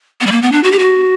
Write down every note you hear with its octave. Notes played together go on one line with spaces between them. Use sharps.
B3
G3
A#3
B3
D4
F#4
G4
F#4